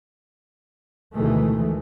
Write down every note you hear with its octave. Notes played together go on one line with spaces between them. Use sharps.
D2 B2 D#3 E3 G#3 A3